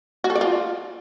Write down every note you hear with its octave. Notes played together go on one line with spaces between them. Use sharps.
F#4
A4
D5
F4